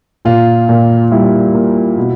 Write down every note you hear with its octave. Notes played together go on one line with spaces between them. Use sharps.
A#2 F4
A#2
G3 E4
A#3
B2